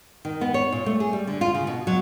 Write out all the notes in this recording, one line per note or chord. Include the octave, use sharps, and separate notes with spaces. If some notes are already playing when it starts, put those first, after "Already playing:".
D#3
B3
C#5
A#2
A3
G#4
G3
D3
F4
C#3
B2
F#3